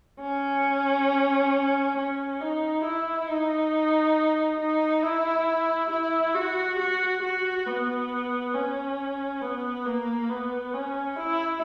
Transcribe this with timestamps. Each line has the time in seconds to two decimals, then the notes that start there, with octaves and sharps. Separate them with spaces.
0.21 C#4
1.97 C#4
2.41 D#4
2.84 E4
3.29 D#4
4.60 D#4
5.03 E4
5.90 E4
6.35 F#4
6.79 F#4
7.23 F#4
7.67 B3
8.54 C#4
9.42 B3
9.86 A#3
10.29 B3
10.74 C#4
11.16 E4